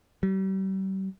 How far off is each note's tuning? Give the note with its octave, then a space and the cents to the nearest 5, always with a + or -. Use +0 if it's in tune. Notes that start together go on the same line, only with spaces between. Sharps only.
G3 -40